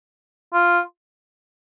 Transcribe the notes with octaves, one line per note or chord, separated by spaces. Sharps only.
F4